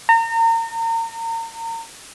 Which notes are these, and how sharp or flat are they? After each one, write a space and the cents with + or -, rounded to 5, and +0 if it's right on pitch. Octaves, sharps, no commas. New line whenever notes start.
A#5 -35